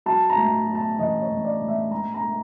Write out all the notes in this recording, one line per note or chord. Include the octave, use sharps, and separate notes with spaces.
F#3 A5
A#5
A2
F#3
A5
A1 D#5
C#5
A1
D5
A2
E5
A2 A#5
A#5
A3